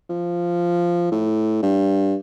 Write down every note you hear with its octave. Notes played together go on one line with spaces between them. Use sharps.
F3
A2
G2